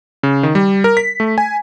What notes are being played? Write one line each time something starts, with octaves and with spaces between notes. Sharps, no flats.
C#3
D#3
G3
A#4
B6
A3
G#5